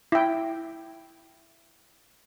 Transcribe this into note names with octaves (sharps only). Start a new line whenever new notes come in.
E4 G5